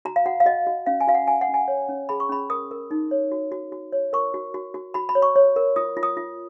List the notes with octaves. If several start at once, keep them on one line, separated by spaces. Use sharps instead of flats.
F#4 A#5
F5
F#4 F#5
F5
F#4 D#5
F#4
C#4 F5
G#5
F#4 F5
F#5
F#4 G#5
F#5
C#4
G#5
C#5
C#4
G#4 B5
C#6
C#4 B5
A#4 D#6
A#4
D#4
C#5
F#4
F#4
F#4
C#5
A#4 C#6
F#4
F#4
F#4
F#4 B5
B5
C#5
C#6
C#5
A#4
F4 D#6
F4
D#6
F4